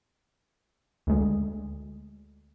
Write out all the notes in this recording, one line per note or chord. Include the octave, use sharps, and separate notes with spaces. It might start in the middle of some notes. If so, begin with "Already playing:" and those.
D2 G#3